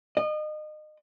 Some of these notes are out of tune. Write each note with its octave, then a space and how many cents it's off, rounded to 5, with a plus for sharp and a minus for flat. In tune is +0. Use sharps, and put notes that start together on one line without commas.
D#5 -30